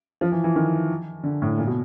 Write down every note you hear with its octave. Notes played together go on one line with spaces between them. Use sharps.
F3
E3
E3
D#3
D3
A2
A#2
B2